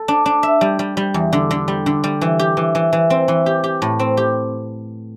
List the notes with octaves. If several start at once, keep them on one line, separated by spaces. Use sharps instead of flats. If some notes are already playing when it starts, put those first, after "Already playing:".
Already playing: A4
D4
D4
E5
G3
G3
G3
E2
D3
D3
G3
D3
G3
E3
G4
E3
E3
E3
C4
E3
G4
G4
A2
C4
G4